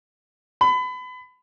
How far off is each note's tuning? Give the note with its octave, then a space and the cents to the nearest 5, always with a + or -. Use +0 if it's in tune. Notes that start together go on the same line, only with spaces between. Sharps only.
B5 +30